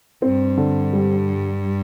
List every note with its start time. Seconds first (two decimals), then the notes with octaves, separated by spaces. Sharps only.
0.22 G2 C4
0.57 D3
0.93 G3